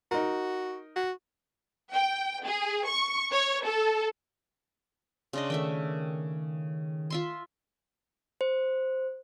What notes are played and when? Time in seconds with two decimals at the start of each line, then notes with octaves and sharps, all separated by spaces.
0.11 D#4 F#4 A#4
0.96 F#4
1.93 G5
2.45 G#4
2.87 C#6
3.33 C#5
3.65 A4
5.33 C#3 D4 D#5 C6
5.50 D#3 A3 E5 G5
7.10 F4 E5 C6
8.41 C5